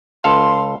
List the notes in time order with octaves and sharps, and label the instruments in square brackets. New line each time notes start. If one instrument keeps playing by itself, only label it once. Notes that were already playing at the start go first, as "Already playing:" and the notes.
[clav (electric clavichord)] C#2 A4 F5 [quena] C6